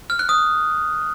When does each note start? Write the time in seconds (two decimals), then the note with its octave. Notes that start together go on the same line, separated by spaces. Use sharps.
0.10 F6
0.19 F#6
0.29 D#6